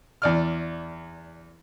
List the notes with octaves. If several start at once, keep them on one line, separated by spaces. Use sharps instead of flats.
E2 D5 F6